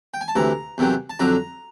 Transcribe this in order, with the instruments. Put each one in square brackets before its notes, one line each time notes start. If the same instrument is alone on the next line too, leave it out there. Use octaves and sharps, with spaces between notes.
[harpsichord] G5
G#5
A5
D2 C3 E3 A#5
E2 C3 D#3 F#3
A5
F2 D3 F#3 A#5